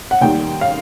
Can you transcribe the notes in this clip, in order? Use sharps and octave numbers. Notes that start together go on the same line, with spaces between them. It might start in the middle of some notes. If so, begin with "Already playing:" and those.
F#5
D#2 D#3 G3 G5
F5